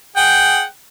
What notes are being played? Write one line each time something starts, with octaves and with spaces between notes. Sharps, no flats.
G#4 F#5 G5